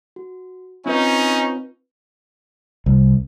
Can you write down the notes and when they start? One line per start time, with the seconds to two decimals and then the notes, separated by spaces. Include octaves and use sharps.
0.16 F#4
0.86 C4 C#4 D#4 F4 B4
2.86 C2